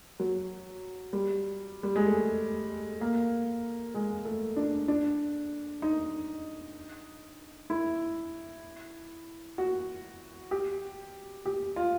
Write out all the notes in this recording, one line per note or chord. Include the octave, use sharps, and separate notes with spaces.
F#3
G3
G3
G#3
A3
A#3
G#3
A3
D4
D4
D#4
E4
F#4
G4
G4
F4